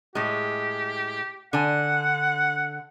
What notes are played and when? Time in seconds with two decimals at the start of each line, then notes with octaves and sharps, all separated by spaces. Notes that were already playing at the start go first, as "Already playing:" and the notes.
0.15 A2 G#3 G4
1.53 D3 F#5 G#5